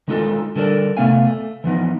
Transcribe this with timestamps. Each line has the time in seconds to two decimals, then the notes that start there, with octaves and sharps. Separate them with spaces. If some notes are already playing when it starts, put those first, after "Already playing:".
0.08 D#3 G#3 D#4 F4 A4
0.56 D3 G3 A4 A#4 D5
0.97 C3 A3 B3 F5 G#5
1.26 A3
1.64 E3 F3 B3 D#4